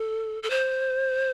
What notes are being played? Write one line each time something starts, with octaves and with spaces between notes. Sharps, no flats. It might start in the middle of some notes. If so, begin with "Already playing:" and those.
Already playing: A4
A4
C5